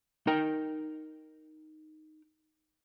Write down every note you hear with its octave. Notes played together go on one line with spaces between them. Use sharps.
D#4 A#4 G5